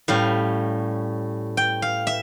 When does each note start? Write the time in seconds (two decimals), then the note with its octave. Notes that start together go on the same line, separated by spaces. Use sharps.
0.08 A2 G3 C#4 F5
1.57 G5
1.82 F5
2.07 E5